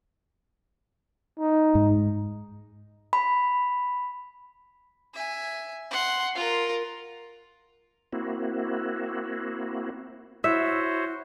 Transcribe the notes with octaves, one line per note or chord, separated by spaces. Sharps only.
D#4
G#2
B5
E5 G#5
F#5 C6
F4 A#4
A#3 C4 E4 F#4
E4 F#4 C5 C#5 E5